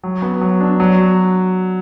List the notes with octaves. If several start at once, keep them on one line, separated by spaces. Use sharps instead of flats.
F#3
B3
F#3
D4
F#3